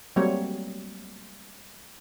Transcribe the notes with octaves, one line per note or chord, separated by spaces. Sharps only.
F#3 G3 A3 A#3 C4 C#5